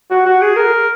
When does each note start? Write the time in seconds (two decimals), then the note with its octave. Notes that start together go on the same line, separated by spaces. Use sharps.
0.10 F#4
0.26 F#4
0.41 G#4
0.56 A#4